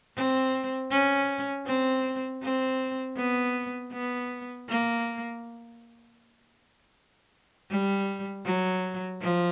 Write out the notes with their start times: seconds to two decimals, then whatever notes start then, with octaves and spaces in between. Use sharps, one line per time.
0.16 C4
0.90 C#4
1.66 C4
2.42 C4
3.17 B3
3.92 B3
4.69 A#3
7.70 G3
8.45 F#3
9.21 F3